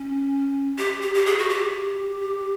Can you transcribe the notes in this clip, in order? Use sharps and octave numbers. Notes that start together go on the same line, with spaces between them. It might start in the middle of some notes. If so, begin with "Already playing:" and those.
Already playing: C#4
G4
G4
G4
G#4
F#4
G4